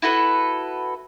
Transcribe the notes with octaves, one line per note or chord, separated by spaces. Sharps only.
E4 F#4 A4 B4